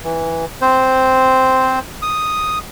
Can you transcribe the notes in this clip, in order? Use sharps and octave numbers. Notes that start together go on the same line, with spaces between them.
E3
C4 C5
D#6